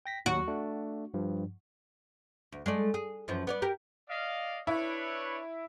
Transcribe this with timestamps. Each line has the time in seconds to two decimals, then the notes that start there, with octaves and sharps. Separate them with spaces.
0.06 G5 A#6 B6
0.26 D#2 F#3 F#4
0.48 A3 D4
1.14 G2 F3
2.52 D2
2.66 G#3 A3 D5
2.94 G#4
3.28 F#2 E3 F3
3.47 B3 C#5 D5
3.62 G4 A#4
4.09 D5 D#5 F5
4.67 D4 E4 B4 C#5